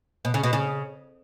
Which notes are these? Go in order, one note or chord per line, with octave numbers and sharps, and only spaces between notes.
B2
C#3
B2
C#3